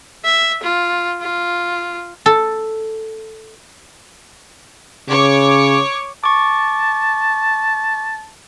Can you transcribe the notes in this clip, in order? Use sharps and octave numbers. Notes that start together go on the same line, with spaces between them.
E5
F4
F4
A4
C#3 C#5 C#6 D6
A5 C#6 D6